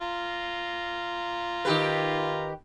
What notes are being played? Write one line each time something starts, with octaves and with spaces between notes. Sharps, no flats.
F4 A#5
D#3 G4 B4